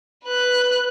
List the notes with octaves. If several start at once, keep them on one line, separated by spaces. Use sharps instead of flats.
B4 F#6